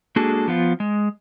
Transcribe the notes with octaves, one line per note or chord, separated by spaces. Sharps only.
G#3 A#3 D4 F#4 G#4 A4
F3 B3 F4
G#3